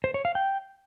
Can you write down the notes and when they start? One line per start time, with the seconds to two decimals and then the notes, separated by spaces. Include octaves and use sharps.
0.04 C5
0.14 C#5
0.25 F5
0.35 G5